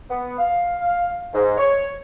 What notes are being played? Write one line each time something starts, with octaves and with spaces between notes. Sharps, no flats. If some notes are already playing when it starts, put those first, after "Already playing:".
B3
F5
G#2
C#5